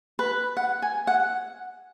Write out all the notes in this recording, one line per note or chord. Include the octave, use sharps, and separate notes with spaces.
B4
F#5
G#5
F#5